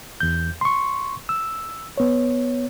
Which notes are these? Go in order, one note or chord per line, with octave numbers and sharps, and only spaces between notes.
E2 G6
C6 C#6
E6
B3 C#5